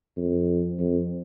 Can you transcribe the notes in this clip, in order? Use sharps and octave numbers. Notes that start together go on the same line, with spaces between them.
F2
F2